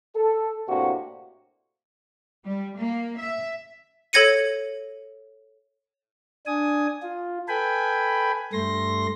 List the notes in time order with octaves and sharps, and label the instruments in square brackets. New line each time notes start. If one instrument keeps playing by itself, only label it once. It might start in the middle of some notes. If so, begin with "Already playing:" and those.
[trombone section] A4
A2 C3 A#3 D4 F#4
[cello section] G3
A#3
E5
[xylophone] A4 C#5 G#6 A#6 C#7 D#7
[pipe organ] D4 G#5 D#6
F4
A4 B4 G5 G#5 B5
G2 A3 C6 A#6